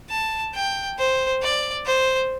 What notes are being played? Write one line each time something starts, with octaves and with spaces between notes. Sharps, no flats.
A5
G5
C5
D5
C5